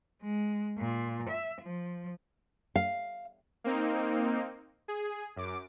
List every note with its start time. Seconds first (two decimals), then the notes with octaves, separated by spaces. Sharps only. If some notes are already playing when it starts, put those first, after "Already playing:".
0.22 G#3
0.79 A#2
1.30 E5
1.62 F3
2.76 F5
3.64 A#3 C4 D#4
4.88 G#4
5.36 F#2 D6